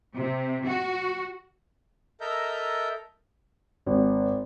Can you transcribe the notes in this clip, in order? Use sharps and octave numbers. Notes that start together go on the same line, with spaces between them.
C3
F#4
A4 A#4 D#5 E5 A#5 G6
G#1